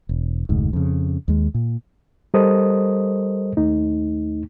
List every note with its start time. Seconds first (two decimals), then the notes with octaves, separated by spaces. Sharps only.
0.09 E1
0.49 F1 D2 G#2
0.73 F2 C#3
1.28 D#2 G#3
1.54 A#2
2.34 G3 A4 A#4 C5 D#5 D#6
3.57 D#2 A3 D#4